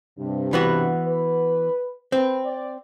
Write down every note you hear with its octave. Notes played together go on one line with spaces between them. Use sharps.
G2 C3
E3 B3 F#4
B4
C4 B4
D5